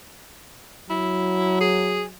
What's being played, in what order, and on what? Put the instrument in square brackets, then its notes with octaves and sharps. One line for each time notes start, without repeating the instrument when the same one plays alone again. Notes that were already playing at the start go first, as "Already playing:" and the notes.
[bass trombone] F#3 [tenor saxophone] E4
[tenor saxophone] G#4